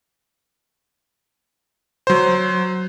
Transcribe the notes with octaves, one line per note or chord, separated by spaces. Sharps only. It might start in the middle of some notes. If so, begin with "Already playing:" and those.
F#3 C5